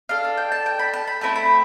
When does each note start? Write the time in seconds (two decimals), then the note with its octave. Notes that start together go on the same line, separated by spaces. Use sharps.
0.09 D4 A4 F5
0.24 F5
0.37 G5
0.52 A5
0.66 G5
0.79 B5
0.94 A5
1.07 B5
1.21 A3 C4 E4 A5
1.36 B5